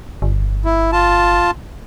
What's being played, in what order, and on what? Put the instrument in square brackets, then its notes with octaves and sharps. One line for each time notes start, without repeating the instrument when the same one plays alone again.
[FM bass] G1
[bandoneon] E4
F4 A5